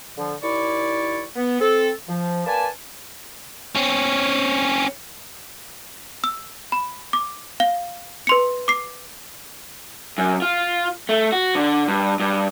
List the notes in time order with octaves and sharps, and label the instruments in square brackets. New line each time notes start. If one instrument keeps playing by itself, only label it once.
[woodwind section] D3 F3
D#2 E4 D5 C#6
B3
C4 A4
F3
A#3 B4 D5 G#5 A5
[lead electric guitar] C4 C#4
[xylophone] E6
B5
D6
F5 G7
B4 C6 C#7
D6 C7
[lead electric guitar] F#2
F4
A3
F#4
D3
G2
G2